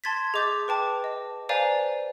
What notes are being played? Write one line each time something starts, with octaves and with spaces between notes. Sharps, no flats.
A5 C6 G#6 A6 B6
G#4 D#5 D6 G6 A6
B4 G5 A5 D6
D#5
B4 C5 D5 F5 G#5 A#5